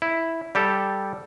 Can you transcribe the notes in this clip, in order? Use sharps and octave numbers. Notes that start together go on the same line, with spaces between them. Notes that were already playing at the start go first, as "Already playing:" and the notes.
E4
G3 G4 A4